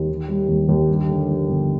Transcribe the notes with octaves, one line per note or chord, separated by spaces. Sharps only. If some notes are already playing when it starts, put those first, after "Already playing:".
Already playing: D#2
D#3
G3
D#2
D#2
G2
D3
F3
G1